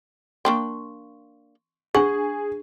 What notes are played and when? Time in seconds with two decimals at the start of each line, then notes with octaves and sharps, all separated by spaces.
0.45 A#3 D4 G5 C6 C#6
1.95 D4 G#4 F#5 C#6